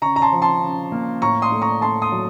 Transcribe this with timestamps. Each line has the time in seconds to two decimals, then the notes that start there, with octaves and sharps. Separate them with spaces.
0.02 C#3 A#5 C#6
0.16 A#5
0.22 A5 C6
0.32 F3
0.42 A5 C6
0.62 C#3
0.92 A#3
1.22 A2 A#5 C#6
1.42 C6 D#6
1.52 A3
1.62 A#5 C#6
1.81 A3 A5 C6
2.02 C6 D#6
2.12 F#3